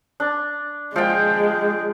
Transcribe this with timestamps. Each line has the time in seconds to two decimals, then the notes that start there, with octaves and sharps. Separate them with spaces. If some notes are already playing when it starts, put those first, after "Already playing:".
0.20 D4
0.96 F3 G#3 G5